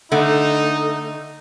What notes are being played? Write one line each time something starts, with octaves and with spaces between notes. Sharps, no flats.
D3 A3 D#4 F#5